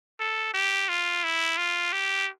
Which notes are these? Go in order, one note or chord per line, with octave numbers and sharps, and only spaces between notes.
A4
G4
F4
E4
F4
G4